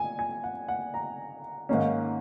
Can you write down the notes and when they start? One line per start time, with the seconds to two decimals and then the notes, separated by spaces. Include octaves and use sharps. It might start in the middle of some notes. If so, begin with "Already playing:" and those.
Already playing: G#5
0.19 G#5
0.44 F#5
0.68 F#5
0.94 A#5
1.69 G#2 D#3 A#3 C#4